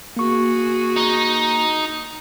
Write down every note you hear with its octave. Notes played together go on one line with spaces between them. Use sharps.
A#3 F#4 G#4 C#6
D#4